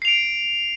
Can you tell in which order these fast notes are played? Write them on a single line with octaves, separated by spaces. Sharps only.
C7 F7 D7